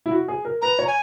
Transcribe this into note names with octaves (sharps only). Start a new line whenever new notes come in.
E4
F#4
G#4
A#4
B4 A#5
C#5
G#5